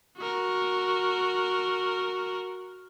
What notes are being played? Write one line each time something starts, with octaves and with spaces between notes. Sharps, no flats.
F#4 A#4